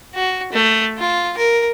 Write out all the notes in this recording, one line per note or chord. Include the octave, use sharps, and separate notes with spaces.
F#4
A3
F4
A#4